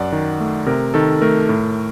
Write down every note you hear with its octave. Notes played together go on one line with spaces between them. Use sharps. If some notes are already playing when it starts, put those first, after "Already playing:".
Already playing: F#2 D5 F#5
D#3
A3
C3 A#4
D#3 A4
A3 A#4
A2 A#4